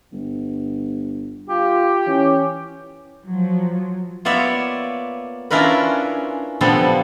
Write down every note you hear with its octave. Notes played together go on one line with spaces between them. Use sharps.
G1
F4 G4
E3 C#4
F3 F#3
A#3 B3 F4 C#5 D5 E5
C#4 D4 E4 F4 A#4 B4
A#2 D3 F3 G3 B3 A4